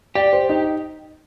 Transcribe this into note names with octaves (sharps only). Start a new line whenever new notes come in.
G4 D5
C5
D#4